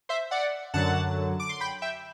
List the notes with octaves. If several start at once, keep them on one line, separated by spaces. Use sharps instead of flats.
C5 E5
D5 F#5
F#2 D3 F#3 F#5 A5
D6
C6
G5 B5
E5 G5